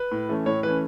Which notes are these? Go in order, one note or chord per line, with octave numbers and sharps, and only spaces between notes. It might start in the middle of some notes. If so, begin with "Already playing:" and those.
Already playing: B4
A2
E3 A3 C#4
A2 C#5
E3 A3 C#4 B4